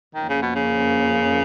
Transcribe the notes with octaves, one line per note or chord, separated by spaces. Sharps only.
F2 D#3 F3 A#3 C#4
C#3
B2
C#3